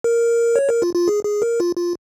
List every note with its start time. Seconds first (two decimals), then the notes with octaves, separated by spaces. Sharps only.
0.04 A#4
0.56 C#5
0.69 A#4
0.82 F4
0.95 F4
1.08 G#4
1.24 G#4
1.42 A#4
1.60 F4
1.76 F4